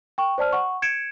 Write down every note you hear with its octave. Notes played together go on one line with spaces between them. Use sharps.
G5 C#6
C5 D5 A5 F6
F#5 C#6
G#6 C#7 D7 E7